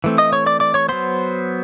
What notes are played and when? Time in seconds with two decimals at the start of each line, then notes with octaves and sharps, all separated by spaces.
0.04 E3 A3 C4
0.18 D#5 D#6
0.33 C#5 C#6
0.46 D5 D6
0.60 D5 D6
0.74 C#5 C#6
0.89 F#3 B3 C5 C6